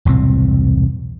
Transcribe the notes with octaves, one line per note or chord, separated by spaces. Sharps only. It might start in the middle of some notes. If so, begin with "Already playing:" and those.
E1 C2 A2 C4